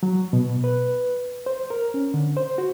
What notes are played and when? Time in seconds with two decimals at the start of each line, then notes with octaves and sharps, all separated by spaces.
0.03 F#3
0.33 B2
0.64 B4
1.46 C5
1.70 A#4
1.94 C#4
2.14 D3
2.37 C5
2.58 F#4